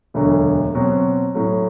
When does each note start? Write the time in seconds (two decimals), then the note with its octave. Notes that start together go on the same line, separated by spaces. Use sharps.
0.14 E1 D2 D3 F#3
0.74 B2 F#3 C4
1.35 A2 F#3 A3